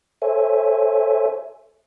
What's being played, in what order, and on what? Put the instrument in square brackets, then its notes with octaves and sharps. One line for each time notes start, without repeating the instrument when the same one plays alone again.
[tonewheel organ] A4 C5 C#5 E5 G#5